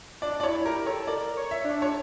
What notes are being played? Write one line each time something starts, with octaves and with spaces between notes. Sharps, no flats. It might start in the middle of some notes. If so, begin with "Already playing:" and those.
D4 D5
D5
E4 C#5
G4 A#4
A4 C#5
A#4 D5
C#5
E5
D4
C#5